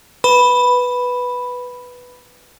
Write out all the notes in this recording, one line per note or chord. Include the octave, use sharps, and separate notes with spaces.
B4 B5